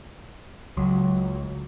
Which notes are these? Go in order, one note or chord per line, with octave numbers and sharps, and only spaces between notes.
C#2 F#3